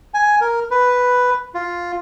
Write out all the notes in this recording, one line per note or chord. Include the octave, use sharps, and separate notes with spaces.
G#5
A#4
B4
F4